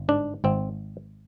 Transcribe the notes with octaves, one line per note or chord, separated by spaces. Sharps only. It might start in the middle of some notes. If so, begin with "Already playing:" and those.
Already playing: G1
G#2 D4
G#1 C4